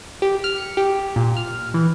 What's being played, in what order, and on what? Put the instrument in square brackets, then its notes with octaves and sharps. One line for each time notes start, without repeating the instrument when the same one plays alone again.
[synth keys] G4
F6
C#7
G4
A#2
F6
E3